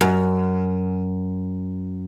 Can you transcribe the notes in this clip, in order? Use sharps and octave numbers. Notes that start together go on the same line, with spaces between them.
F#2